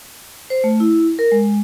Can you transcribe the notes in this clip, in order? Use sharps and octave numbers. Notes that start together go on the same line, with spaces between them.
C5
A3
E4
A#4
G#3